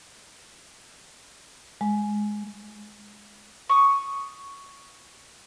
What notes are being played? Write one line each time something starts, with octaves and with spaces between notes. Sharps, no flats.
G#3
C#6 D#6